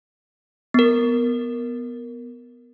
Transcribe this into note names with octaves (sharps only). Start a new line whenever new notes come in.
B3 A#4